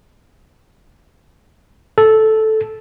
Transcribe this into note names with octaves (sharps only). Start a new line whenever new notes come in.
A4